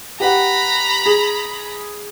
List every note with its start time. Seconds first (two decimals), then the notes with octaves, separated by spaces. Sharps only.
0.20 G4 B4 F#5 A#5 B5
1.06 G#4